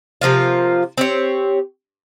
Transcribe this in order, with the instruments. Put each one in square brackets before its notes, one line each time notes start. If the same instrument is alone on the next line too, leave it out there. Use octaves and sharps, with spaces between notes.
[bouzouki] C3 F3 A#3 F4
C4 G4 C#5